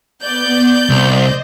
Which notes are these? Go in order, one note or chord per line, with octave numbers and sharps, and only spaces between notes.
B3 D5 G6
C2 C5 D#5